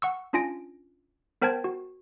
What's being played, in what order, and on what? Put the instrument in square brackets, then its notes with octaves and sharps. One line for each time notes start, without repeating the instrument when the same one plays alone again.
[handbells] F#5 C#6 E6
C#4 D4 F4 G#5 A#6 D7
B3 A#4 C5 G5 A5 G#6
F#4